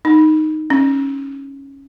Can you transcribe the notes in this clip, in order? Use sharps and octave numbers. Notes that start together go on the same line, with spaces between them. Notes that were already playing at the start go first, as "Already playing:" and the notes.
D#4
C#4